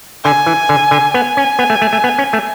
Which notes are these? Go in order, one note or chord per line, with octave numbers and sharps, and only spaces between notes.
D3 G#5
E3
D3
D3
B3 G#5
C#4
B3
A3
A3
A3
B3
C#4
A3